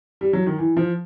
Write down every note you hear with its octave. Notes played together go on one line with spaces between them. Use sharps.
G3
F#3
D#3
E3
F3